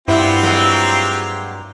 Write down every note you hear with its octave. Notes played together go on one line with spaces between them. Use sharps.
G2 B3 C4 E4 F4 G4
F#3 G#3 A#3